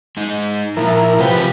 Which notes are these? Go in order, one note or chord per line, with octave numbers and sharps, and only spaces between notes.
G#3 D#4
A#2 F3 E4 A#4
C3 F3 A3 G4 B4